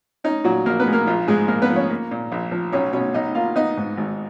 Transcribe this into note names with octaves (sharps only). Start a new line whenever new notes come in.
C#4 D#4
A#2 F#3 F#4
A#1 A#3 A#4
B3 B4
G#3
A#3 A#4
A#1 F4
G#2 G#3 G#4
A#1 A#3 A#4
B3 B4
F3
C#4 C#5
A#3
A#2
A#1
F3
B1 C#4 C#5
B2 C#4 C#5
B1 D#4 D#5
A#3 F4 F5
B3 D#4 D#5
G#2
G#1